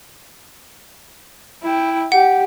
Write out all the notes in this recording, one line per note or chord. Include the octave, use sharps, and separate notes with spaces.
E4 G5
G4 F#5